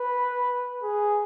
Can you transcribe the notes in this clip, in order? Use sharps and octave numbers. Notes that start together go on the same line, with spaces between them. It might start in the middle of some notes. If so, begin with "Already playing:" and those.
Already playing: B4
G#4